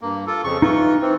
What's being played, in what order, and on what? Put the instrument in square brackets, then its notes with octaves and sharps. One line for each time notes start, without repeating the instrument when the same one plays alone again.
[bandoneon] G2 A#3
F4 A4
F2 C#3 C#6
[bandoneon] E3 F4 [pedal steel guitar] D#4 C#6
[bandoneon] E3 C4